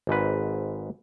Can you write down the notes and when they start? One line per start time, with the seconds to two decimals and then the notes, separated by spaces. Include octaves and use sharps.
0.07 G#1 G#2 B4